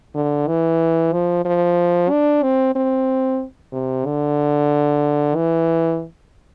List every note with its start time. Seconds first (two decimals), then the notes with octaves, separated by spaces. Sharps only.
0.15 D3
0.48 E3
1.12 F3
1.45 F3
2.10 D4
2.43 C4
2.75 C4
3.72 C3
4.05 D3
5.35 E3